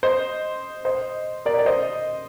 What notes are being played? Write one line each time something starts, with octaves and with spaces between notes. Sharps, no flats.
C5 D#5
C5 D#5
A#4 D5
D5
C5 D#5